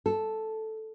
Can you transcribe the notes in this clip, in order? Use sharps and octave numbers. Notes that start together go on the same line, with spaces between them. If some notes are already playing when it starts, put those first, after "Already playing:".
A4